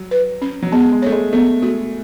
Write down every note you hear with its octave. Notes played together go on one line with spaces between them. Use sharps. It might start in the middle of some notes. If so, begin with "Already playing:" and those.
Already playing: F#3
B4
C#4
F#3
G#3 B3
G#3
A3 C#5
G#3
A3 B3
A3 F#4